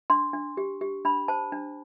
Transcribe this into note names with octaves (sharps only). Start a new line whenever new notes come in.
D4 C6
D4
G4
G4
D4 B5
C5 A5
D4